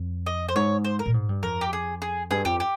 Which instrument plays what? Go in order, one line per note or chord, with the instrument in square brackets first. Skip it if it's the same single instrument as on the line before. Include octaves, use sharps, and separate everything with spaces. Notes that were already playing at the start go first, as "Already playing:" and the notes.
Already playing: [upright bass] F2
[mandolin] D#5
C5
[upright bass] G#2 [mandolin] C#5
[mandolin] C5
A#4
[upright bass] A#2
G#2
G2
[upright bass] F2 [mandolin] A#4
[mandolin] G4
G#4
G#4
[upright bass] G2 [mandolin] G#4
[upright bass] F2 [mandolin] G4
[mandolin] G4